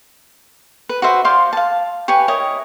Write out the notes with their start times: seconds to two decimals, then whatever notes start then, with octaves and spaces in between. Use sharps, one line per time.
0.89 B4
1.02 F#4 B4 C5 E5
1.25 C5 D5 F5 C6
1.53 F5 A5
2.08 G4 B4 C#5 G#5
2.28 E4 A#4 C#5 D#5